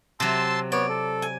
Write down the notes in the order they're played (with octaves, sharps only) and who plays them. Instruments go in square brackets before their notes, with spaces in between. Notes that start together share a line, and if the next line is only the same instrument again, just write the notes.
[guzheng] C3 F#3 [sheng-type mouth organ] A5 C6 E6
[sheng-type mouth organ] B3 C#5 [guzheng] D5
[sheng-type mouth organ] A4
[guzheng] G#5